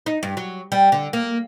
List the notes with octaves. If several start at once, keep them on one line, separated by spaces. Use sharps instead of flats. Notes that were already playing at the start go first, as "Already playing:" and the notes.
D#4
G2
F#3
G3
D3
A#3